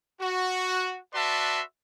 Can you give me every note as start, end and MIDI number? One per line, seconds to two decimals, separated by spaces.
0.21 0.97 66
1.14 1.61 66
1.14 1.61 71
1.14 1.61 74
1.14 1.61 76
1.14 1.61 81
1.14 1.61 84